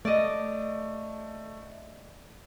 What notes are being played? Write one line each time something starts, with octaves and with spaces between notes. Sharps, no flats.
A3 D5 D#5